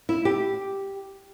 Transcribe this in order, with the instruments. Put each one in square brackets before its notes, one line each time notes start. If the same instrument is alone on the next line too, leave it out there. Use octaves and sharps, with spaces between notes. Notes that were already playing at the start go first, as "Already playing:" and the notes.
[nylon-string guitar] E4
G4